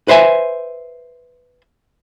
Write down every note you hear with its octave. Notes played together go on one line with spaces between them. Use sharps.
B4 C5 E5 G#5